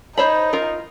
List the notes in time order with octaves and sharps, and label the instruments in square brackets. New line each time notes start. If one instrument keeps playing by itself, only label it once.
[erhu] D#4 [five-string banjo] C5 C#5 B5
[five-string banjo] F4 A#4